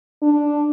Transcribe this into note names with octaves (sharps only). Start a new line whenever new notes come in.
D4